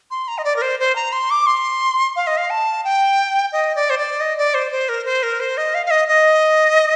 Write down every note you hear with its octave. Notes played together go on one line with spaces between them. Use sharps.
C6
A#5
D#5
D5
A#4
C5
C5
A#5
C6
D6
C6
F5
D#5
F5
A5
G5
D#5
D5
C5
D5
D#5
D5
C5
C5
A#4
C5
A#4
C5
D#5
F5
F5
D#5
D#5